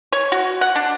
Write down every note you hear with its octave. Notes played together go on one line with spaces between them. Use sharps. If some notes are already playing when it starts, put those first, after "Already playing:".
C#5
F#4
F#5
D4